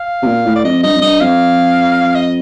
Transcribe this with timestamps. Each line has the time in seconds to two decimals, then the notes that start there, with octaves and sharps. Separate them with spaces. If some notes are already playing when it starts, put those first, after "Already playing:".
Already playing: F5
0.22 C3
0.27 A#2
0.46 A2
0.55 D5
0.65 F2 D#5
0.83 G2 D#5
0.96 F2
1.02 G2 D#5
1.21 F2 F5
2.15 D#5